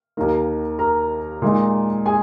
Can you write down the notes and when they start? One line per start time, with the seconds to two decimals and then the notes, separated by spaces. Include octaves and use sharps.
0.17 D#2 D#3 A#3
0.79 A#4 A#5
1.42 A#2 G#3 D#4
2.06 G#4 G#5